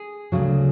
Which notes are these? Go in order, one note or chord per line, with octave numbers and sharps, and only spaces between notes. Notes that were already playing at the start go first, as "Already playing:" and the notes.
Already playing: G#4
D2 C#3 F#3